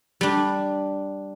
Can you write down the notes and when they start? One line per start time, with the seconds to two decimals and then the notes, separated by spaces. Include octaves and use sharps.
0.21 G3 D4